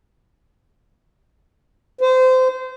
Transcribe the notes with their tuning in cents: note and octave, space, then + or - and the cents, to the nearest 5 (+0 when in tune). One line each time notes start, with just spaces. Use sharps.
C5 -25